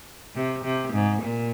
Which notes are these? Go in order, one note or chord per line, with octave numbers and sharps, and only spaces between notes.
C3
C3
G#2
A#2